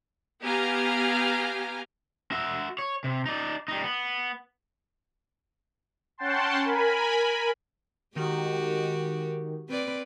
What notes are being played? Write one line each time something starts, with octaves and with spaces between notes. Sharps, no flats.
B3 G4 F5 G#5 A#5
F#4 E5
C#5
C3
D#4 D5
G3 D#4
B3
C#4 F#5 G5 A5 C6
A#4 G#5 B5
D#3 G#3 F#4 G4
C4 B4 D5